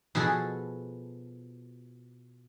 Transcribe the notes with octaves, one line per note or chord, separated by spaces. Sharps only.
B2 F3 F#4 G#4 A4